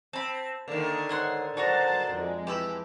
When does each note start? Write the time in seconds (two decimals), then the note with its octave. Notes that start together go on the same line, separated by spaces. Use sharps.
0.13 C4 A5 B5
0.68 D3 D#3 A#3
1.09 G#2 C#5 F#5 C6
1.57 D4 F#4 C5 F#5 A5 A#5
2.16 F2 G#3
2.47 E3 G4 A5 B5 E6